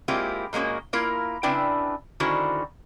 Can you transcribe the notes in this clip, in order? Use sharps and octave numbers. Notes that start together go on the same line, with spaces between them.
G#3 A#3 C4 E4 F4 G4
A#2 G#3 A#3 C#4 F#4
A#3 E4 F4 A#4
C#3 C4 D4 E4 B4 G5
D3 D#3 C#4 E4 F#4 C5